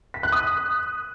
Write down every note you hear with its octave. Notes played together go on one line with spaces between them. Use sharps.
B6
F#6
D#6